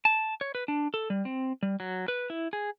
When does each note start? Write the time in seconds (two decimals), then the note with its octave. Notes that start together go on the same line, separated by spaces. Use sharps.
0.05 A5
0.41 C#5
0.55 B4
0.68 D4
0.94 A4
1.10 G3
1.25 C4
1.63 G3
1.80 F#3
2.08 B4
2.30 E4
2.53 G#4